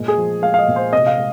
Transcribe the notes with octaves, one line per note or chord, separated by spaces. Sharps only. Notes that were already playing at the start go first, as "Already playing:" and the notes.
Already playing: A#2 G#3
G#4
F3
G#3 F5
F5
D#5
A#2
C5
C3 D#5
F5
G#3